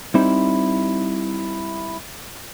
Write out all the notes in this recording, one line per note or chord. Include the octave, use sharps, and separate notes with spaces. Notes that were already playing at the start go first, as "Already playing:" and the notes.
G3 C4 D#4 E4 C5